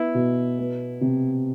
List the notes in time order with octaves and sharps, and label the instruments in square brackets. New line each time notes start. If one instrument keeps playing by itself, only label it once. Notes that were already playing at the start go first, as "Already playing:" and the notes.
Already playing: [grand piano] B3 [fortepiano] E4
[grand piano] B2
B3
C3